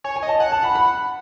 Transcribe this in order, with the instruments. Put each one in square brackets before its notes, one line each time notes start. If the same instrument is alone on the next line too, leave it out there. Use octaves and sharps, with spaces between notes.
[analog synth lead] C#5 [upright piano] G#5
[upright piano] G#5
[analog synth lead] D#5
[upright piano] A5
[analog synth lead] F#5 [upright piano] G#5
[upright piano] A5
B5
B5